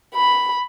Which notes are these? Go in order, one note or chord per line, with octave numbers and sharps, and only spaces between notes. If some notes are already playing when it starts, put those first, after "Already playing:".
B5